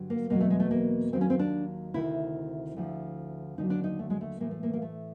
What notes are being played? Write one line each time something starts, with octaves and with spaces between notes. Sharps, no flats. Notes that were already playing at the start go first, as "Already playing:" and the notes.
Already playing: G2 D3 F#3
A#3
E2 B2 F#3 A#3
A3
G#3
A3
A#3
D#2 D#3 F#3 C4
C#4
C4
D4
D2 C3 D#3 E4
D2 D3 F3
D#2 D3 F#3 D#4
D4
D#4
A3
G#3
A3
A2 E3 A#3
A3
A#3
A#3
A3